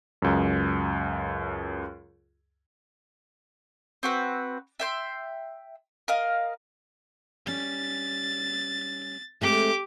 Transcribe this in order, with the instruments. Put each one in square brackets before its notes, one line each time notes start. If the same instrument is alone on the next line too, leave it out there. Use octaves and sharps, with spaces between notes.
[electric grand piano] C#2 F#2
[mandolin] C4 F#4 B4
E5 G5 C6
A#4 D#5 F5
[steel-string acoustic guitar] G3 C#4 [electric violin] A6
[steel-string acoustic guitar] G#3 A3 C4 [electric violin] G4 D6